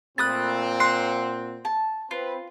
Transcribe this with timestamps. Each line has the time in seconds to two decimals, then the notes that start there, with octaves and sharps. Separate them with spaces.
0.18 A#2 A3 C4 B5 D#6 F#6 A6
0.80 F#5 C6 C7
1.65 A5
2.11 C4 F4 B4